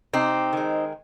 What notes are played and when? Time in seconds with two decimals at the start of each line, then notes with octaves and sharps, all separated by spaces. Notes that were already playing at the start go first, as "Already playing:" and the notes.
0.13 C3 C4 D#4
0.53 D#3 G#3